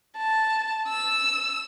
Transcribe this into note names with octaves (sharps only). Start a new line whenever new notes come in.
A5
E6